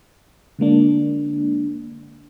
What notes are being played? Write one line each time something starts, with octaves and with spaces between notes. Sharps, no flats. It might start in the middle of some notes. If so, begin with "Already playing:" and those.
D3 G#3 A#3 D4